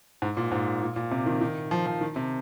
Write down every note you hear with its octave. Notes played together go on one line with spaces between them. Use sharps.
G#2
A#2
G#2
A#2
A#2
C3
D#3
D#3
F3
F3
D#3
C3